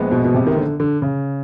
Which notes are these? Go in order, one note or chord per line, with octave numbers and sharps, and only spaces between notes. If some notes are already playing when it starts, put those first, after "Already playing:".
Already playing: A#1 A#2 F3 G#3 B3
B2
B2
C3
D#3
D3
D3
C#3